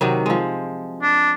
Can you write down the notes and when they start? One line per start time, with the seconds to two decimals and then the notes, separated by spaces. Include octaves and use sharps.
0.01 C3 D#3 F#3
0.26 F3 G#3
1.02 D4